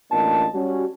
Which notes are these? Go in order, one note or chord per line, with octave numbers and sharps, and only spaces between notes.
A1 A#3 D4 F4 D#5 A5
G3 C#4 F#4